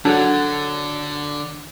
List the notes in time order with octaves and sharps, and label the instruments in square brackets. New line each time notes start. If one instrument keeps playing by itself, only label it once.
[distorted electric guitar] D3 [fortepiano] F#3 [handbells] D4 [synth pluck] G#4 A4 F#5